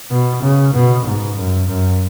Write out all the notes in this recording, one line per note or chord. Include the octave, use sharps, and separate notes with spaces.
B2
C#3
B2
G#2
F#2
F#2